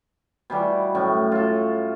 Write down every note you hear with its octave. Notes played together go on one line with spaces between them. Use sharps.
B2 E3 G3
F#2 A2 C#6
F4 A4